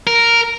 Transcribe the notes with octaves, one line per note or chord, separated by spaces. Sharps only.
A#4